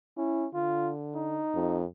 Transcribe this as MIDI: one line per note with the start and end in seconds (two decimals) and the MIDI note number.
0.18 0.47 61
0.18 0.47 64
0.54 1.44 50
0.54 0.92 65
1.15 1.81 63
1.55 1.85 41